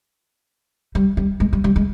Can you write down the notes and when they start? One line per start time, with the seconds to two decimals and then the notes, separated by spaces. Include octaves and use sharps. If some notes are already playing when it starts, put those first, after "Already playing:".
0.95 G3
1.17 G3
1.40 G#3
1.53 G3
1.64 G3
1.76 G#3